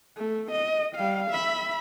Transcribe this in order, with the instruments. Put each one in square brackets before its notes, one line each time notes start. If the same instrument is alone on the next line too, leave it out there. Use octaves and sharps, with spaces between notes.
[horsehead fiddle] A3
D#5
G3 F5
E5 B5